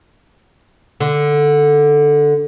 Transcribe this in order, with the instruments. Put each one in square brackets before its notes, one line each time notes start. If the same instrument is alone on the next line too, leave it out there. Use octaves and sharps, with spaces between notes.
[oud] D3